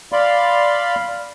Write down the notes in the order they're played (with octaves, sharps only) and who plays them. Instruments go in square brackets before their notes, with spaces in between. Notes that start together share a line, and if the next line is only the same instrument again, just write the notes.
[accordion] D5 F5 B5 C6